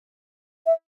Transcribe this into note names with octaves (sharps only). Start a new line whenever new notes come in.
E5